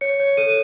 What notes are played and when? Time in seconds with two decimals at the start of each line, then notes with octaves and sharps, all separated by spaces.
0.01 C#5 C#7
0.20 C#5
0.37 A4 D#7